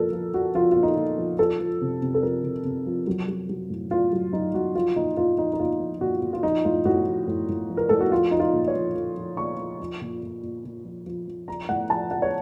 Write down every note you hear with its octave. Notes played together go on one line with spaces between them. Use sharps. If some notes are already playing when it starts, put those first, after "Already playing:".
Already playing: A#2 F3 A4 A#4
F3
F3 F#4
F3 F4
A#2 F4
D#4
A#2
F3
F3 A4
F3
C3
C3
A4
F3 A#4
C3
C3
F3
F#3
F#3
F#3
A2
A2 F4
F#3
F#3 D#4
F#3 F#4
F3 F4
A#2 D#4
A#2 F4
F3 D#4
D#4
A#2 F4
F3
A#2 F#4
A#2
F4
F3 D#4
A2 F4
A2 F#4
F3
A2
A2
F3
A#4
A2 A4
F#4
F3 F4
F3 D#4
F4
A#2
C#5
F3
F3
F3
A#2 C#6
F3
F3
A#2
A#2
A#2
A#2
F3
F3
F3
F3 A#5
A2 F#5
F3 A5
F3 F#5
C#5